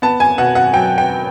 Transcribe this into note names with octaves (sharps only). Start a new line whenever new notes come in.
B3 A5
G#5
B2 F#5
F#5
F#3 G5
G5